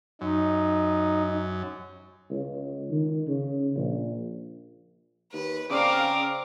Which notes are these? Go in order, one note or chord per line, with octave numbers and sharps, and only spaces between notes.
F#2 D#4
C#2
D#3
C#3
A#1
D#2 B4
C#3 C4 A#4 D5 F5